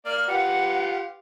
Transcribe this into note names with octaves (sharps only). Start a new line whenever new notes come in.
A#3 D5 F6
F4 G4 B4 F#5